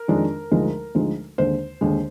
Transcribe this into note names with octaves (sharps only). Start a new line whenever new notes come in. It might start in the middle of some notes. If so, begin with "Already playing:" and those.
Already playing: A#4
F2 D#3 G#3 D4
D2 D3 F3 G#3 D#4
D2 D3 F3 G#3 D#4
D#2 D3 G#3 C5
D#2 D3 G#3